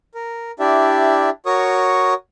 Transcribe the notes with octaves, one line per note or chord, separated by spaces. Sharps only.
A#4
D4 E4 G4 D5 E5
F#4 A#4 C#5 C#6 D#6